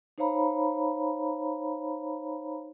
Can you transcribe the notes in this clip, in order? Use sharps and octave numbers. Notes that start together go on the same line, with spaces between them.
D#4 C5 C#5 F5 A#5 B5